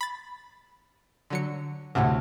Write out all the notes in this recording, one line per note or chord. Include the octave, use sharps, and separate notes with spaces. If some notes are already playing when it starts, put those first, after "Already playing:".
B5 A6
D3 F#3 C#7
D2 A2 C3